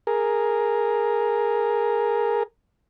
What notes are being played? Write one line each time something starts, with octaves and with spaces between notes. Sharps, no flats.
G#4 A#4